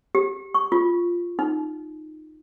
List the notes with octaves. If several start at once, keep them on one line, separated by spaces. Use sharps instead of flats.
G4
C#6
F4
D#4